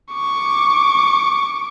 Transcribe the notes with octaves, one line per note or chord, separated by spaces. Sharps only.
C#6 D6